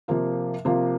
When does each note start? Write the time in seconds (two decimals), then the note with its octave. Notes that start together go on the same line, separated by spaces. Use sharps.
0.08 C3 F3 A#3 F4
0.65 C3 F3 A#3 F4